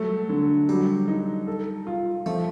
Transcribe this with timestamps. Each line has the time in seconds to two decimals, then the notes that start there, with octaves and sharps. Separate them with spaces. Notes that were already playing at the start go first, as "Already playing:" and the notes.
Already playing: F#3 G3 A3
0.29 D3
0.69 F#3 G3
1.08 D#4
1.47 A4
1.87 F4
2.26 F3 A3